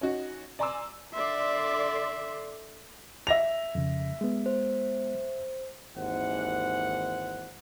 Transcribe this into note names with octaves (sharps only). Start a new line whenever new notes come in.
C#4 D#4 F#4
D5 G#5 A#5 C6 D6 E6
D3 D5 E5 C6
E5 A#6 F7
F2 C#3
G#3 B3
C5
G#1 D#2 E3 C5 F#5